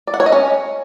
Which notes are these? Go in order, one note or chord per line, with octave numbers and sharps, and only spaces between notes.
D5
F#5
C#5
D#5
C#4